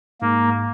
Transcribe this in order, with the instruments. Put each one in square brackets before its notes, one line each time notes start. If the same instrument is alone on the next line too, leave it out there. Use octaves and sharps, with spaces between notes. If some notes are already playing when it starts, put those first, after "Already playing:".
[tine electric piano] G#2 [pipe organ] A#3